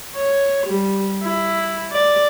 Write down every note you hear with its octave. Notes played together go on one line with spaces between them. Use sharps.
C#5
G3
E4
D5